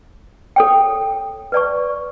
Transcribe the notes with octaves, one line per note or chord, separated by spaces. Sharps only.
A4 C#5 G5
B4 D5 A5 C#6